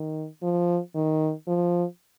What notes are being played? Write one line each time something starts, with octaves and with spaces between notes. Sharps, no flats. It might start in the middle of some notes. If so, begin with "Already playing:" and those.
Already playing: D#3
F3
D#3
F3